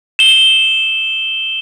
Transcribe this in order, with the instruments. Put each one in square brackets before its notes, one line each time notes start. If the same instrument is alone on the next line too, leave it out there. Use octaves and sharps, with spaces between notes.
[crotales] E7 G7